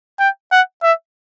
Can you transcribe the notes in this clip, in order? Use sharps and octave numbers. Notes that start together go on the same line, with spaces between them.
G5
F#5
E5